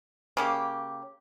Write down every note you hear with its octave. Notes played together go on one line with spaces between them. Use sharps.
C#3 A#3 G4